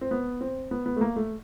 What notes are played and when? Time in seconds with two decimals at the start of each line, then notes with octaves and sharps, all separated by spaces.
0.01 C4
0.11 B3
0.41 C4
0.71 B3
0.86 B3
0.96 A3
1.01 A#3
1.16 A3